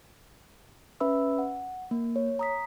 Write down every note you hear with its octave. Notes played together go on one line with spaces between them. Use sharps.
C#4 B4 E5 B5 E6
F#5
A#3
C#5
A#5 D#6 B6